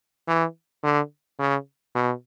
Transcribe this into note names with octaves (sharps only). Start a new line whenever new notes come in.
E3
D3
C#3
B2